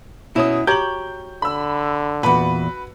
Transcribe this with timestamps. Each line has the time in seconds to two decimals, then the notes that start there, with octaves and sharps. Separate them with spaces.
0.36 B2 C#4 E4 D#6
0.67 F#4 G4 C#5 A#5 G6 F#7
1.42 D3 B5 E6
2.23 E2 A#2 F#4 B4 B5